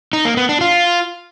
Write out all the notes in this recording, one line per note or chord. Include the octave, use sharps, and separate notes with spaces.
D#4
A#3
B3
D4
F4